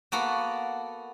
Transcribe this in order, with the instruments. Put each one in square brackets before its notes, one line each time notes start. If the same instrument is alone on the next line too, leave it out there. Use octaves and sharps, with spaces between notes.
[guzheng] A#3 B3 F#4 A4